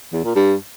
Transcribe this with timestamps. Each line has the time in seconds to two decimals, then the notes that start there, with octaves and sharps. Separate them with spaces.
0.13 E2
0.24 A#2
0.35 G2